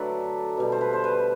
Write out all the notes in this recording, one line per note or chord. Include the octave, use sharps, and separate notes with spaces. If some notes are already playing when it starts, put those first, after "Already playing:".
Already playing: D3 F#3 A3 A4 B4 D5
B2 G3
C5
B4
C5
B4